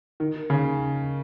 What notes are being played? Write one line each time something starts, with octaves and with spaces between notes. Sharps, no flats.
D#3
C#3